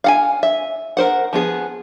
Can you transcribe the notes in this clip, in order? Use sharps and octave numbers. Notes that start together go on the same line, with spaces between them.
F5 F#5 G#5
E5
A#4 C5 F#5
F3 B3 G#4